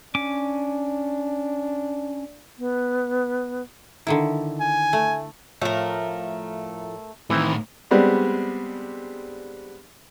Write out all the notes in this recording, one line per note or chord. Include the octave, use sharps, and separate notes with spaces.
C#4 D4 D6
B3
D3 D#3 E4
G#5
A3
A2 F3 A3 A#4 F5
A2 D#3 E3 C4 E4
G3 G#3 B3 C4 D4